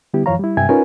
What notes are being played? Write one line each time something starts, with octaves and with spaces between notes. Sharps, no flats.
D3 G3 B3 E4 G4
F#2 E3 F3 C#5 F5 A#5
G3 E4
G2 C3 E5 G5 G#5 G#6
C#4 D#4 F4 A#4 B4 G#5